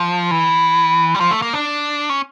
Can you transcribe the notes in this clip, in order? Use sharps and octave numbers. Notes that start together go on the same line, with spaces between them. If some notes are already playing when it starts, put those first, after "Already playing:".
Already playing: F3
E3
G3
F3
A3
A#3
D4
C#4